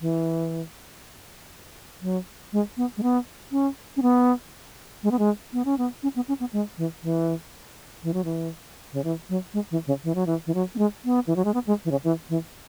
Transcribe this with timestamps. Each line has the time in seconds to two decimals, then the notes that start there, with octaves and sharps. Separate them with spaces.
0.01 E3
2.02 F#3
2.53 G#3
2.77 B3
2.97 G#3
3.03 B3
3.52 C#4
3.97 C#4
4.02 B3
5.03 G#3
5.11 B3
5.19 G#3
5.53 B3
5.65 C#4
5.78 B3
6.03 C#4
6.16 B3
6.28 C#4
6.40 B3
6.53 G#3
6.78 E3
7.03 E3
8.03 E3
8.14 F#3
8.25 E3
8.93 C#3
9.04 E3
9.29 F#3
9.54 G#3
9.71 E3
9.87 C#3
10.04 E3
10.15 F#3
10.27 E3
10.46 E3
10.55 F#3
10.75 B3
10.78 G#3
11.05 B3
11.27 E3
11.36 F#3
11.45 G#3
11.54 B3
11.67 G#3
11.85 E3
11.91 C#3
12.04 E3
12.29 E3